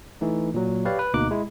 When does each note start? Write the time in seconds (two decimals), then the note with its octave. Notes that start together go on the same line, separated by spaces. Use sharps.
0.21 E3 A3 D#4
0.54 A#2 F#3
0.85 G4 B4 C#5 D5 F5
0.99 B4
1.14 D2 B2 A#3 D#4 D6 F#6
1.31 G#3 E4